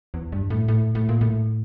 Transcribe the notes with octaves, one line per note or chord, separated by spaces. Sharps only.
E2
G2
A2
A2
A2
A#2
A2